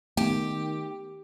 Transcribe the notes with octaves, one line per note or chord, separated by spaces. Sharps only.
D#3 A3 B3 G4